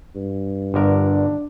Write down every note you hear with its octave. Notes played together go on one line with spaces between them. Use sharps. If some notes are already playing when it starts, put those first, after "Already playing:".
G2
G1 D3 D4 A#4